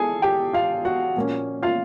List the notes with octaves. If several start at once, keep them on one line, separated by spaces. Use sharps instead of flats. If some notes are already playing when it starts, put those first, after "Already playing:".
Already playing: E3 G#4 A4 G#5
G4 G5
F4 F5
F#4 F#5
A#2 F3 A#3 C#4
F4 F5